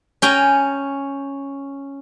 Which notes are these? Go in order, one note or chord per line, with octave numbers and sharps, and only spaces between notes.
C#4 G5 G#5 A#5